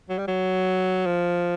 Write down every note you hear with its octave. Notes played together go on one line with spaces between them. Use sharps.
F#3
G3
F#3
F3